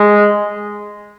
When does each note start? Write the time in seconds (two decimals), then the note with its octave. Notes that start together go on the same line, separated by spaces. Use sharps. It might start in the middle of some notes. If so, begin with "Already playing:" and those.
Already playing: G#3